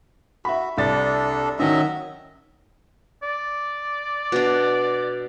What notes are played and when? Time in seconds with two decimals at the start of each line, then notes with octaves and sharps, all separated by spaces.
0.45 F#4 E5 B5
0.78 C2 D4 A4 A6
1.59 D#3 F#3 C#4 D#5 E5
3.23 D5
4.32 B2 D4